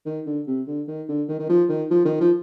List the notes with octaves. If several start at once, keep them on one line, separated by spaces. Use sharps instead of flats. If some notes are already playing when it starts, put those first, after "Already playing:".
D#3
D3
C3
D3
D#3
D3
D#3
D#3
F3
D#3
F3
D#3
F3